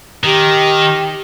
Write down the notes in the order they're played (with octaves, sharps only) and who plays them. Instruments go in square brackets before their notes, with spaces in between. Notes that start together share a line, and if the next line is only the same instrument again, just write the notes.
[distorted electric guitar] D#3 [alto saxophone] G4